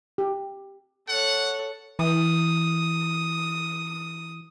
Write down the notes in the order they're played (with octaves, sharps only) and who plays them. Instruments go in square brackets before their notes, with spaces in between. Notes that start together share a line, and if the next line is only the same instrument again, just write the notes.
[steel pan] G4
[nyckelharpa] A4 C#5 [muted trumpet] F#5
[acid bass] E3 [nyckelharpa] D#6